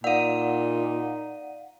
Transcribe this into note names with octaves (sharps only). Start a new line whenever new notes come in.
A#2 D#4 D5 F5 F#5 D#7